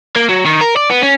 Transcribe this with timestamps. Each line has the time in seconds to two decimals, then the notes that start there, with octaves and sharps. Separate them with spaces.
0.16 A#3
0.29 F#3
0.46 D#3
0.61 A#4
0.76 D5
0.90 B3
1.02 C#4